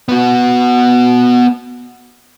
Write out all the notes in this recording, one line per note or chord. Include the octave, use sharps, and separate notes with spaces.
B3 F#4